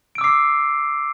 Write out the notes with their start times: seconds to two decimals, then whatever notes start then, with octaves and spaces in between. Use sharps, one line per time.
0.15 D7
0.18 E6
0.21 D6
0.24 C7